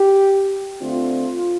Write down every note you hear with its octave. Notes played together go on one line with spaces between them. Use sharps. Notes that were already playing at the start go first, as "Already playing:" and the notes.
Already playing: G4
D3 A3 C4 F4